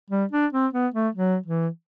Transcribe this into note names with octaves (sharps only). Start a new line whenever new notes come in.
G3
D4
C4
B3
A3
F#3
E3